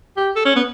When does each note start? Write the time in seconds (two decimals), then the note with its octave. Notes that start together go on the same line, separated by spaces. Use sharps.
0.17 G4
0.36 A4
0.45 C#4
0.56 B3